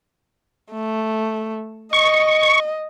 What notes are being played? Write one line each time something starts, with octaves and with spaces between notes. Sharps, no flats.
A3
D#5 C#6